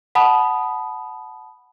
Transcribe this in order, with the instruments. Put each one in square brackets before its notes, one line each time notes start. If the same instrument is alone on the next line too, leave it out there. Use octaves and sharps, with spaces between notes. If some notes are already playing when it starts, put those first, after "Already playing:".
[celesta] F#5 A5 B5 D#6